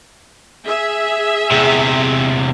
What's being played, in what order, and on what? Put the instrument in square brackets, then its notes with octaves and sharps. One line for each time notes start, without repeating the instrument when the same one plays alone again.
[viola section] G#4 E5
[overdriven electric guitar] E2 C3